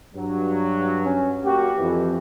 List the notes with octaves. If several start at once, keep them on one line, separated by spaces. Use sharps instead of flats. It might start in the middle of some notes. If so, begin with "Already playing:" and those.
G2 F#3
C#4
A#3 F#4 G4
F2 E3